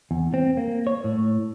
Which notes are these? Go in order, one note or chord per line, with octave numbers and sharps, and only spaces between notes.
E2
C4
A#3
C#5
A2